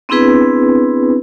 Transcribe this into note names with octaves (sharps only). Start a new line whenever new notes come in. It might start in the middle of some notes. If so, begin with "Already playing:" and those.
B3 C4 D4 E4 G#4 B4